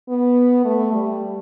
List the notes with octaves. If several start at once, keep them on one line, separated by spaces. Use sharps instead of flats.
B3
A3
G3